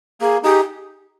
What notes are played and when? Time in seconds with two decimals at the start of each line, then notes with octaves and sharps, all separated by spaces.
0.21 A#3 G#4
0.44 D#4 G4 G#4